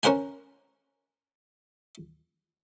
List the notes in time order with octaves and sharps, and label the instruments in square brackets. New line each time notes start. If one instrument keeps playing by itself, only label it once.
[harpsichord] C#4 A#4 C5 F#5 G#5